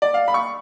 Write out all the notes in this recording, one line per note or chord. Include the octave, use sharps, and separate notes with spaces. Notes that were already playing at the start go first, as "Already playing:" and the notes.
D5
F5
B5
C#6